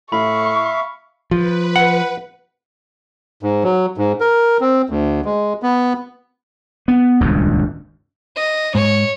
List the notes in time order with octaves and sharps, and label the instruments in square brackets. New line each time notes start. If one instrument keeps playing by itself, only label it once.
[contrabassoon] A2 [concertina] E5 F5 [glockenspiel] B5 [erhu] C#6
[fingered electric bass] F3 [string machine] B4
[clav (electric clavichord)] F#5
[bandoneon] G#2
F#3
G#2
A#4
C4
D2
G#3
B3
[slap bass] B3
D#1 C#2 G2
[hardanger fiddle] D#5
[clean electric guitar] G#2 [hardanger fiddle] C#5